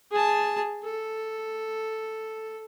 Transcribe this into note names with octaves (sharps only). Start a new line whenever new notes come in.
G#4 A5
A4